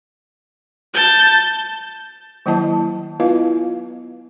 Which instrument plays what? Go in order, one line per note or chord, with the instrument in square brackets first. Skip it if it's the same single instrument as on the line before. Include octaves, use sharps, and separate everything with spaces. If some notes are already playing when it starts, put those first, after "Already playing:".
[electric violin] A5 G6
[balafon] D#3 F#3 A#3 E4 D#5 A5
B3 E4 F4 B4 D#5 F5